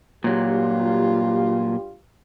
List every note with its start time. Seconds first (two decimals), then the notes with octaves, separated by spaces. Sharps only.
0.24 G2 A#2 F#3 F4 G4